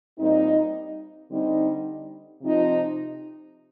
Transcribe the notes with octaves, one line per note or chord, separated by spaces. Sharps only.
A#2 G3 C4 D#4
D3 G3 C4 D#4
C3 F3 C4 D#4